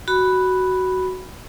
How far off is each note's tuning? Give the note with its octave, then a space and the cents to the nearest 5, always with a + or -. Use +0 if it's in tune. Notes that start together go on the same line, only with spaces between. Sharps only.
F#4 +10 B5 +0